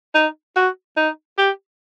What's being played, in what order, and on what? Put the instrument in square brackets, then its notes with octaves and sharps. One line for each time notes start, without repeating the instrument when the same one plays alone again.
[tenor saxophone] D#4
F#4
D#4
G4